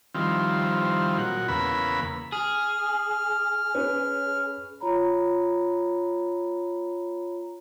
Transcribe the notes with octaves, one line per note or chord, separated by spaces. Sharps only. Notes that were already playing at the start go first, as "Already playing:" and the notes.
D#3 F3 G3 C4 E4 F4
A#2 F#3 F#5
E2 C#3 A#3 B4 B5 E6
G#4 F6
C#4 B4 C#5
F4 C#5 A#5 B5